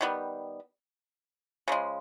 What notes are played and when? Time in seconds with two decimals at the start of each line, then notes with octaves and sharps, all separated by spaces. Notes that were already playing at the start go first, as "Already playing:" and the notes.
0.01 D#3 G3 B3
1.68 C#3 F3 G#3